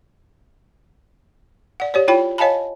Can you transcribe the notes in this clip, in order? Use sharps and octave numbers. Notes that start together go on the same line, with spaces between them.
D5 F#5
G4 C#5 D5
E4 F4 C#5 G5 B5
C#5 D#5 F5 G#5 A5 B5